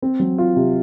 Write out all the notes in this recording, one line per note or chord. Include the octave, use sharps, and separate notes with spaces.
C4
F#3
F4
C3